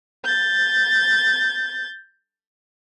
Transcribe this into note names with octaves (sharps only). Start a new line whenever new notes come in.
G6 A6